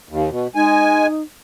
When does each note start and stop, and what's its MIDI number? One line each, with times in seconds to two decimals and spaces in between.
0.09 0.30 39
0.30 0.47 47
0.55 1.07 56
0.55 1.22 63
0.55 1.07 80